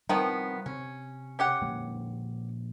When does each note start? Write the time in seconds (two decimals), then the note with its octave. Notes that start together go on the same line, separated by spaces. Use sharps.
0.09 D#3 F3 G3 B3 C4
0.66 C3 C#4
1.39 C#4 G4 F#5
1.61 A#1 G#3 A#3